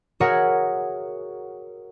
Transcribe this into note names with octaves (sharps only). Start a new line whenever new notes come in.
F#4 G#4 A#4 C#5 E5 F#5